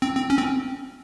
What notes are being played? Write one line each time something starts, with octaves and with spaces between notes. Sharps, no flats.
C4
C4
C#4
C4